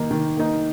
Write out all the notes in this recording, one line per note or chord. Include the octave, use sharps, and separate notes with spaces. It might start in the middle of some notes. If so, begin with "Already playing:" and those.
Already playing: D#3 A#3 D#4
D#3
A#3 D#4